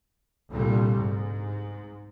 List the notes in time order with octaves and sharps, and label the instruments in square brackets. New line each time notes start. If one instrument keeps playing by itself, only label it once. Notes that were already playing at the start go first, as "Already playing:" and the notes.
[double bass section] C2 A#2 D3 G3 A3
G#2